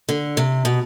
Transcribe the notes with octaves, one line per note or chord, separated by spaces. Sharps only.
D3
C3
B2